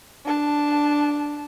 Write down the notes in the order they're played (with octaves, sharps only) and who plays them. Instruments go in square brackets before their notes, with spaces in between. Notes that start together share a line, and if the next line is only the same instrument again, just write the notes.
[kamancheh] D4 A5